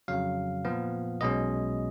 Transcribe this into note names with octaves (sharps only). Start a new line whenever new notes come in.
F2 C#3 F#3 F5
A#2 F3 B3
B1 B2 G#3 C#4 D#5